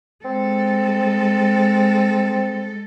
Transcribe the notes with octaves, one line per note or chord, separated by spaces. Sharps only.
G#3 C4 A4